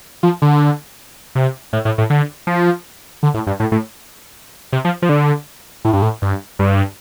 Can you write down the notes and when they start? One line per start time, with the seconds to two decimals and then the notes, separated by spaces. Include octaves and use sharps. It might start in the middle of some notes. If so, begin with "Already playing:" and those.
0.23 F3
0.42 D3
1.35 C3
1.73 A2
1.85 A2
1.98 A2
2.10 D3
2.47 F3
3.23 D3
3.34 A2
3.47 G2
3.60 A2
3.72 A2
4.72 C3
4.85 F3
5.02 F3
5.09 D3
5.85 A2
5.93 G2
6.02 A2
6.22 G2
6.59 G2